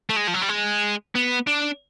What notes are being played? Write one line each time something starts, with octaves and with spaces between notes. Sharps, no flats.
A3
G#3
F3
F#3
G3
G#3
B3
D4